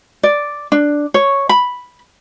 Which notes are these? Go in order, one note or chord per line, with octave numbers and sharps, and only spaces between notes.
D5
D4
C#5
B5